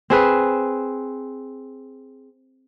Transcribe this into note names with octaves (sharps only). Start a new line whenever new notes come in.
C4 G#4 B4